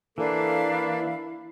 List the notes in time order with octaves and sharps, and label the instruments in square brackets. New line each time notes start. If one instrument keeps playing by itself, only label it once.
[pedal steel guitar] E3 [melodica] A#3 [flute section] D4 F5 B5 [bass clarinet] A4
[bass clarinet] E4